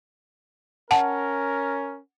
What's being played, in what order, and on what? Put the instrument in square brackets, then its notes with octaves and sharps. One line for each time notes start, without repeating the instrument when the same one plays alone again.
[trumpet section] C#4 A#4 [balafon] F#5 A5